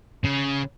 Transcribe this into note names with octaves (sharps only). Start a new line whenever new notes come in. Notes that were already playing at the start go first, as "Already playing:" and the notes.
C#3